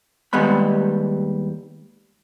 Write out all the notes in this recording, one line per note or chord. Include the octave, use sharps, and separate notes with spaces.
D#2 G3 G#3 B3 B5